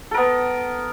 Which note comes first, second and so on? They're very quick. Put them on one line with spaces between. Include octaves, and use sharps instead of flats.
A4 A#4 B3